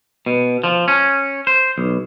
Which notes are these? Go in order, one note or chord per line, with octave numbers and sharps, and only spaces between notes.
B2
F3
C#4
C5
B1